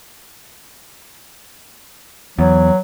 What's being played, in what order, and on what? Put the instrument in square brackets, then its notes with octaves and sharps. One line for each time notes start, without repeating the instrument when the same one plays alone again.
[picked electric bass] E2 [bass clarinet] F#3